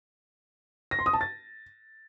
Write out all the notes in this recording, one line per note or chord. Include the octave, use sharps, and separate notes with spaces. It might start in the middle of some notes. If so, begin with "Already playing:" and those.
A#6
C6
D#6
A5
A6